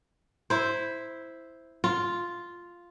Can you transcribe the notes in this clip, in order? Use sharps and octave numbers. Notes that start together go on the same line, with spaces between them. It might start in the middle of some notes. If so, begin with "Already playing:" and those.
E4 C5
F4